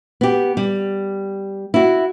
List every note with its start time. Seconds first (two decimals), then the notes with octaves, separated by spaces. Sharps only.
0.21 B3 G4
0.57 G3
1.74 E4 F#4